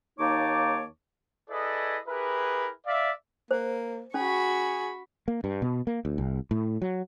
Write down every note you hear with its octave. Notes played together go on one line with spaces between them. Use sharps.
D#2 A#3 D#4 C#5 A5 D6
E4 G#4 A4 B4 D5 D#5
E4 G4 G#4 A#4 B4
D5 E5 F5
A#3 C5
C#4 F#4 G#4 B5 C#6
A#3
G2
B2
A#3
D2
C2
A2
F#3